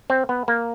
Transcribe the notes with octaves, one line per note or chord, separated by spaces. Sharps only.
C4
B3
A#3